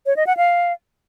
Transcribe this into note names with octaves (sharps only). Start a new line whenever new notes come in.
C#5
D#5
F#5
F5